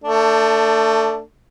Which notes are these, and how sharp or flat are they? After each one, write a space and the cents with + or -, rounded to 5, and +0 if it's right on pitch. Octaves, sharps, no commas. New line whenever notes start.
A3 +25 D4 +0